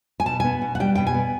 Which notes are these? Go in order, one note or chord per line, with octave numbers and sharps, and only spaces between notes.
G#5
B2 A5
B3 G#5
B2
F#5
G3 G5
B2 G5
G#5
B3